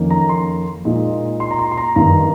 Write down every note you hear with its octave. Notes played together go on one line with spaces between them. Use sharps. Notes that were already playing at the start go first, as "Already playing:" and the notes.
Already playing: F2 D#3 A#3 C#4
A#5
C6
A#2 G#3 D#4
C6
A#5
C6
C6
A#5
G2 D#3 A#3 A#5